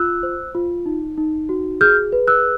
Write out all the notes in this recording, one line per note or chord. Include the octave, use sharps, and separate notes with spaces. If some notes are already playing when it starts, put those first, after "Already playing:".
Already playing: F4 E6 F#6
C5
F4
D#4
D#4
F#4
G#4 F6 G6
B4
E6 F#6